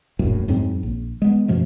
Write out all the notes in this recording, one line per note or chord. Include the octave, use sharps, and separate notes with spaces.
D#1 A#1 F#2 A2
F2 G#2 F#3 C4
A#1
G#3 B3
F#2 B2 F3 A3